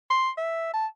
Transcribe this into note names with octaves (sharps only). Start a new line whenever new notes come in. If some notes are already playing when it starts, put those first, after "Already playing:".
C6
E5
A5